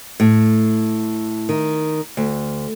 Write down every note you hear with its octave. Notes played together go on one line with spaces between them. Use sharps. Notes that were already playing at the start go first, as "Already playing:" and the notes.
A2
D#3
D2